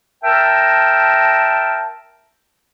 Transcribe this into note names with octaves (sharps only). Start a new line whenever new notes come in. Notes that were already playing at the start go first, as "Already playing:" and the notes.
A#4 E5 G5 A5